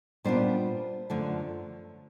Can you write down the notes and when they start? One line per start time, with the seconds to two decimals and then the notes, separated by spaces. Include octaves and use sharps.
0.24 A#2 G3 B3 D4 F4 C5
1.10 F#2 D3 F3 A3